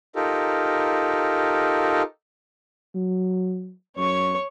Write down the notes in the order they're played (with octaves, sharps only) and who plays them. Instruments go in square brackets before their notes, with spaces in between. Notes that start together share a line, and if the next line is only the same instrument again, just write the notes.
[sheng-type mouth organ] D#4 F4 G4 A4 A#4
[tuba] F#3
[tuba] F#2 [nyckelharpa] C#5 C#6